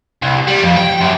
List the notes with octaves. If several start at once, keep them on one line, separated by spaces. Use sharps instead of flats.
C2
G3
F2
G5
F#2